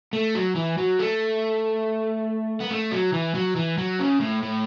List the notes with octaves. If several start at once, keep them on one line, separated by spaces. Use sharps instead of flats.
A3
F#3
E3
F#3
A3
B3
A3
F#3
E3
F#3
E3
F#3
C#3
A2
A2